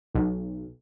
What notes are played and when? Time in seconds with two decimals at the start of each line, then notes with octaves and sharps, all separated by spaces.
0.14 B1